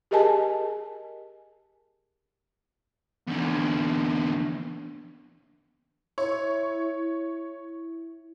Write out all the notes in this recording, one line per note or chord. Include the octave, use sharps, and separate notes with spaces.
G4 G#4 A#4 D#5 G#5 A5
E2 D3
E4 C#5